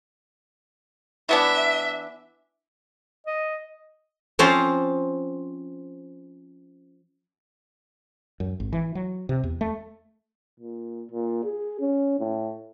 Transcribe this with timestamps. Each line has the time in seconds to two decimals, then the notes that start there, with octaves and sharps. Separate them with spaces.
1.29 E3 B3 D4 E5
3.26 D#5
4.39 F3 C4 C#4 C5 A5 A#5
8.40 F#2
8.60 G#1
8.73 E3
8.95 F#3
9.29 C3
9.43 E2
9.61 A3
10.60 A#2
11.11 A#2
11.44 G#4
11.80 C#4
12.20 A2